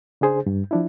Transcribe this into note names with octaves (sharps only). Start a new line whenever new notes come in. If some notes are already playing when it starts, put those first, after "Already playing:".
C#3 D4 G#4 C5
G2
F3 D4 E4